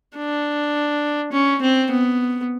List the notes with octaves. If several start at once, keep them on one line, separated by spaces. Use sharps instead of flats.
D4
C#4
C4
B3